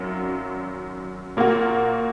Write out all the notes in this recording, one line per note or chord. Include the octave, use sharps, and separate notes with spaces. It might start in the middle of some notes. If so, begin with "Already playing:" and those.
Already playing: G#1 F#2 F#3
A#2 A#3 F#4